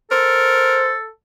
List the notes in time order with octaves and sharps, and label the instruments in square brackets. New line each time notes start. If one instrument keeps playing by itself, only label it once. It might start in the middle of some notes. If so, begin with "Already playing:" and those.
[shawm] A4 [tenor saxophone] A#4 [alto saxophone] C5